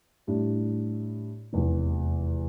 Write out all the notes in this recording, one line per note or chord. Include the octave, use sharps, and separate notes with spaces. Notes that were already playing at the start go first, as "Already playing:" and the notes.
A2 G3 D4 G4
F1 E2 C3 E3